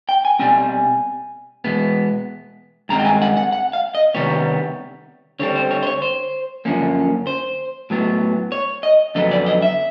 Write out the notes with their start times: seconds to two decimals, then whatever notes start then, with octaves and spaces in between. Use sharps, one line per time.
0.09 G5
0.25 G#5
0.39 B2 G3 C4 G#5
1.64 E2 B2 G#3 B3
2.89 G2 D#3 G#3 C4 A#5
2.99 G5
3.05 G#5
3.22 F#5
3.37 F#5
3.52 F#5
3.73 F5
3.95 D#5
4.14 C3 D#3 G3 B3 C#5
5.39 D3 G3 C4 C#5
5.56 C5
5.71 C#5
5.83 C5
5.87 C#5
6.02 C5
6.65 F#2 D3 F3 A#3 C#4
7.27 C5
7.90 A2 F#3 B3
8.52 C#5
8.83 D#5
9.15 F2 D3 F#3 B3 D#5
9.31 D5
9.46 D#5
9.62 E5